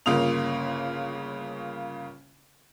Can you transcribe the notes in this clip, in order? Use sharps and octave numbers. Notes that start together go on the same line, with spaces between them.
G1 C#3 A#3 F4 D#6 F7